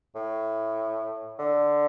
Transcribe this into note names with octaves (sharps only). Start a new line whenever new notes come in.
A2
D3